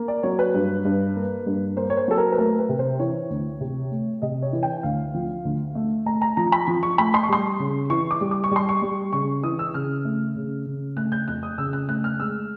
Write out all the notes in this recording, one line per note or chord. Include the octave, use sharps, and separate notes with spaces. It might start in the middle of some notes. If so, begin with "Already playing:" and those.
Already playing: A#3
D5
F#3 C#5
B4
G2
G2
A#3
G2
A#3 C5
C#5
C5
F#3 A4
A#4
B4
A3 A#4
B4
C3
C5
E3 C#5
D2
C3
A3
C3 D#5
C#5
E3
G5
D2 F5
F3
D2
A3
A3 A#5
A#5
F3 A#5
B5
F3
C#6
A3 B5
C6
C#6
G3 C6
C#3
E3 C#6
D6
G3
D6
C#6
G3 C6
C#6
G3
C#3 C#6
E3 D#6
E6
C#3 F6
A3
C#3
C#3
A3 F#6
G6
F2 F#6
D#6
C#3 E6
F#6
A3 F#6
F6
G#3 E6